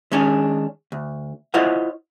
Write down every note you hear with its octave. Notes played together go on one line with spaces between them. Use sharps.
D#3 G#3 C#4 D4 G#4
D2
E4 F4 C5 C#5 D#5 F#5